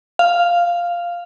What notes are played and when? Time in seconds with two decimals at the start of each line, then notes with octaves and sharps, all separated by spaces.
0.19 F5